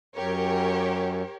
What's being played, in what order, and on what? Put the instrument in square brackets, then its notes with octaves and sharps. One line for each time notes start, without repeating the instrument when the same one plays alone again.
[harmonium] F#2 [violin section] G4 A#4 C#5